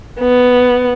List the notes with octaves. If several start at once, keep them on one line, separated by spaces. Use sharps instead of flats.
B3